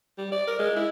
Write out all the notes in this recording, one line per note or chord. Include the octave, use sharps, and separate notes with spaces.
G3
D5
A#4
G#3
E4